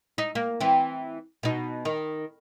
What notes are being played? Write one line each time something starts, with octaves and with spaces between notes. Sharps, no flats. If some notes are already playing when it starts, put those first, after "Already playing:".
D#4
A#3
E3 C4
B2 D#4
D#3